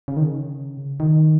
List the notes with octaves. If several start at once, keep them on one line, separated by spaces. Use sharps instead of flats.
C#3
D#3
C#3
D#3